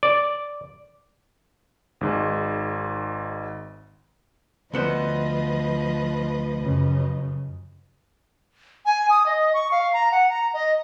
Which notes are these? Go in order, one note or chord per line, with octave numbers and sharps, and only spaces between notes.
D5
G#1 G#2
D2 F3 B3 B4 C5 D#5
F#2 C#3
G#5
D#6
D#5
C#6
F5
A#5
F#5
A#5
D#5